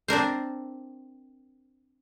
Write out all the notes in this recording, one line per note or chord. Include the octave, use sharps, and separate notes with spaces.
C4 D4 A#4 C5